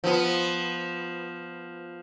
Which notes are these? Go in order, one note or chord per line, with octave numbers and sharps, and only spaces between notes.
F3 B3